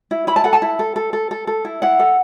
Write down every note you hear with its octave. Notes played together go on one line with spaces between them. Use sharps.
E4
E4 B5
A5
A4 F#5
A5
E4
A4
A4
A4
A4
A4
E4
E4 F#5
A4